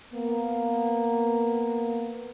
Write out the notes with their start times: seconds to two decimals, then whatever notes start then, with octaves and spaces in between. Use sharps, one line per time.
0.14 A#3 B3